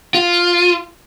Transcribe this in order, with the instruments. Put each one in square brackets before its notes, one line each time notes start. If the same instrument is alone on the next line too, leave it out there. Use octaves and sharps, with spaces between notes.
[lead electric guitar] F4